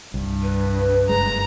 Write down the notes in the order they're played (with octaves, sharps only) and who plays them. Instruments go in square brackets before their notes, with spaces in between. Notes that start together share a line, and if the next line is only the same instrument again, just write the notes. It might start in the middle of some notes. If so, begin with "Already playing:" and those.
[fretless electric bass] C2 [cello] G2
[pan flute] B4
[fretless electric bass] F#1 G#3 [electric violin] A#5